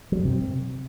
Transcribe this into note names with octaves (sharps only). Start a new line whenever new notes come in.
F#3
F#2
C3